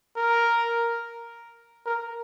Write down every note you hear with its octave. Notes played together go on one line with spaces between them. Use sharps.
A#4
A#4